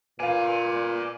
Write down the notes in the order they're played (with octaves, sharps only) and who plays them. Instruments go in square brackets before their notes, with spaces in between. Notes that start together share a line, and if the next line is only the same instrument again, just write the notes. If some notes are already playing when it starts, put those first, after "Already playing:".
[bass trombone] A#2 [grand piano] B4 F5 [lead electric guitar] D5 G#5